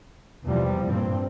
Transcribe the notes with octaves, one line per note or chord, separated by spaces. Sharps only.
E2 C3 F3 G3
G2 A#2 C4